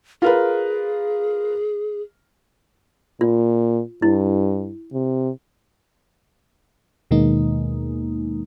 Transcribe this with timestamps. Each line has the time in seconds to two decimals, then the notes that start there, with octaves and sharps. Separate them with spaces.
0.22 F4 G#4 A#4 B4
3.21 A#2 F4
4.02 G2 E4
4.93 C3
7.11 D#2 B2 D#3 G#3 A#3 D#4